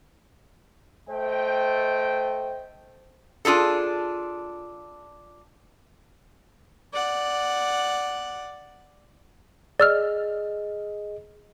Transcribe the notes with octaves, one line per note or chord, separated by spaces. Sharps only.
A3 C5 D#5 G5
D4 F4 G#4 A4
D5 F#5
G#4 D5 D#5 E6 F6